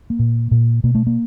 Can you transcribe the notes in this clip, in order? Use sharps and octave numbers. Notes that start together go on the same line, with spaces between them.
A#3
A#2
A#2
B2 A#3
A3
A#3